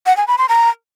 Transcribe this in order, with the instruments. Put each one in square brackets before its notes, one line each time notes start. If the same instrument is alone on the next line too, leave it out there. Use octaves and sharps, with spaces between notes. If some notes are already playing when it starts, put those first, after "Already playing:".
[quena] F#5
G#5
B5
C6
A#5